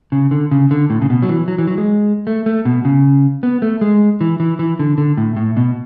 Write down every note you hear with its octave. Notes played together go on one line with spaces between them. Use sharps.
C#3
D3
C#3
D3
A2
C#3
B2
F#3
E3
F#3
E3
F#3
G#3
A3
A3
B2
C#3
B3
A3
G#3
E3
E3
E3
D3
D3
A2
A2
B2